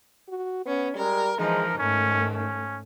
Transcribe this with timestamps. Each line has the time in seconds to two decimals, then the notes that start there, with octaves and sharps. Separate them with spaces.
0.29 F#4
0.66 B3 C#4
0.96 G3 G#3 A#4
1.38 E3 F3 G#3 D#4 A#4
1.78 G#2 D#3 A3 C#4
2.35 C#4